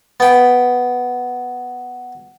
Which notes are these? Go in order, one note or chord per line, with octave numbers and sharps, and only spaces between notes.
B3 G5